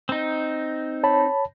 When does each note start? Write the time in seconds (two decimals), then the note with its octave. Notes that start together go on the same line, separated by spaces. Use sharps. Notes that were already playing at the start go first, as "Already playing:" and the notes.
0.09 C4 D#4
1.03 C#5 A5 B5